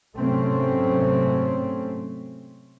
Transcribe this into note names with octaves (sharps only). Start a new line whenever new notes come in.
G#2 C3 F#3 A3 C4 C#4